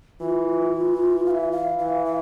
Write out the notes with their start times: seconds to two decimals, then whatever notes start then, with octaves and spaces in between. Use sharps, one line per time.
0.20 E3 F4
0.73 E3
1.26 F5
1.31 E5
1.52 F5
1.79 E3 F5
2.05 E5